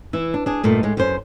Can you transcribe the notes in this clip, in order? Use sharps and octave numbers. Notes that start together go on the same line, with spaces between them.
E3 E4
D4
D4 G#4
G2 A#2 A3 D#4
A2 G#3
F#2 B3 C#4 C5